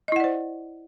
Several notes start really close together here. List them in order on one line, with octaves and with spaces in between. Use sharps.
D#5 E4 F#5 D5 C5